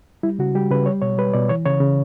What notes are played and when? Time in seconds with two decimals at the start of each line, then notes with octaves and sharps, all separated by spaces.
0.23 G3 E4
0.39 C#3 F#4
0.55 G3 G4
0.70 C#3 B4
0.86 G3 C#5
1.02 B2 C#5
1.18 G3 B4
1.33 B2 D5
1.49 E3 C#5
1.66 C#3 C#5
1.80 C#3